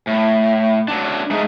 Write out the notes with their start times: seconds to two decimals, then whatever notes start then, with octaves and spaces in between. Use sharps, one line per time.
0.07 A2
0.88 F#3 D4
1.31 G#3 A3 D#4 G#4